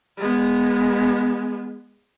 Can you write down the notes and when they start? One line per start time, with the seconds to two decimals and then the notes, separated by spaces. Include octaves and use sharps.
0.18 G#3 B3